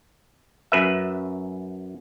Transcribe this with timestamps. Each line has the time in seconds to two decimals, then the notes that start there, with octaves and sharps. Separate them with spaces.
0.72 F#2 B4 E5